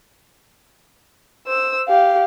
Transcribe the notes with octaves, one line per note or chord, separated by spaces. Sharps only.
C5 E6
G4 F5